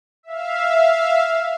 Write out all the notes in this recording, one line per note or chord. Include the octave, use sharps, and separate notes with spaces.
E5 F5